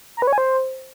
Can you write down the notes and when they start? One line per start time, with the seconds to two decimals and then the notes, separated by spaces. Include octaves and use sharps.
0.17 A#5
0.22 B4
0.27 C#5
0.33 G#5
0.38 C5